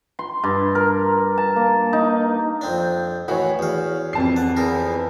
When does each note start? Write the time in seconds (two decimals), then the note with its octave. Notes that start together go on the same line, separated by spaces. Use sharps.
0.19 C6
0.44 G2
0.75 A#4
1.38 A5
1.56 A#3
1.93 D#4
2.61 F2 C4 D4
3.28 A2 E3 F#4 C#5
3.59 E2 F5
4.13 F2 A5 C7
4.36 F#5
4.57 E2 E3 A#4